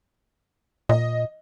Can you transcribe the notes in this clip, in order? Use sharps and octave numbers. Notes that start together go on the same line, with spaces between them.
A#2 D#5